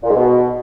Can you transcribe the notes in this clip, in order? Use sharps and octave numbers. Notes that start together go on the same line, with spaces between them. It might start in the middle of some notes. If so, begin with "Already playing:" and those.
A#2
G#2
B2